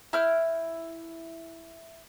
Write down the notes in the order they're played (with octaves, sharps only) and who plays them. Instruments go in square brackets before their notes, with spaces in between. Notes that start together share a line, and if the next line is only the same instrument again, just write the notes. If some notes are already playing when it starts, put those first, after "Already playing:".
[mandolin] E4 F6 G6